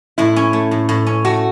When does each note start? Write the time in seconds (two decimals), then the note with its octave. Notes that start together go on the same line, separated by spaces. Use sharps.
0.18 A2 E4
0.36 C#4
0.53 A3
0.71 A2
0.89 A2
1.06 C#4
1.25 A3 F#4